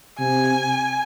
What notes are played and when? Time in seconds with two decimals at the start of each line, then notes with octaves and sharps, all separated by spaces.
0.19 C3 G#5